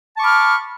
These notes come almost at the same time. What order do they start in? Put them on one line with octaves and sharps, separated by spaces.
A5 C#6 D6 B5 F6